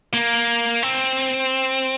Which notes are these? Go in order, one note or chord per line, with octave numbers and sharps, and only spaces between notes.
A#3
C4